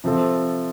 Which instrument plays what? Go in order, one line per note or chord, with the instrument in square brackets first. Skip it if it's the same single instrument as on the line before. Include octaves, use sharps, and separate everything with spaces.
[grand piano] C3 F3 C4 A4